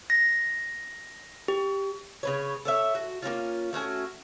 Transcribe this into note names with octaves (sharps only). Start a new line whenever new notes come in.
A#6
G4
C#3 B4 C#5
A4 C#5 E5
F#4
A#3 C4 C#4 F4
A3 C#4 F#4 G#5